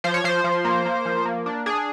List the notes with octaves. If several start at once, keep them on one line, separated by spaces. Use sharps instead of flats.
F3 C5
C#5
F3 C5
F3
A#3
A#3
F3
A#3
D4
D4 G#4